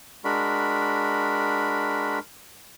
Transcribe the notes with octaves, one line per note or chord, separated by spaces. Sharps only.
G#3 D4 F#4 A#4 B5